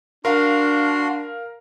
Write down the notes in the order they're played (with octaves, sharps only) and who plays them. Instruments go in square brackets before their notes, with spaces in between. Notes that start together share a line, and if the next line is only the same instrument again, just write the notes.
[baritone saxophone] D4 [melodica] F#4 C6 [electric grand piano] A#4 F5